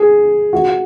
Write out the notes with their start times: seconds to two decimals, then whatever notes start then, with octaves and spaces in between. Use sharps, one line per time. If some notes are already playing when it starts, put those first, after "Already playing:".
Already playing: G#4
0.53 F#4